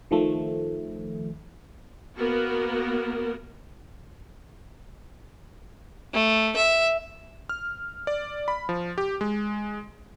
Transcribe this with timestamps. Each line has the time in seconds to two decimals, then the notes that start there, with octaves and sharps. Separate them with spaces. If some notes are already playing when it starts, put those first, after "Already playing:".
0.11 D#3 F3 A3
2.16 A#3 B3 F#4 A#4
6.14 A3
6.57 E5
7.49 F6
8.07 D5
8.48 B5
8.69 F3
8.98 G4
9.21 G#3